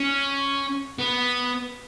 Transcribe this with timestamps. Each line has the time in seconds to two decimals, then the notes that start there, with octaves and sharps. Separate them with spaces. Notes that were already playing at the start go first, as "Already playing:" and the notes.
Already playing: C#4
0.99 B3